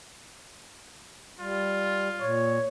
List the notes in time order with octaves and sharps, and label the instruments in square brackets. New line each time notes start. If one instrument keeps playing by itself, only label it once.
[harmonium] G3 [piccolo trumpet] F4
[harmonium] A#2 [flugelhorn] C#5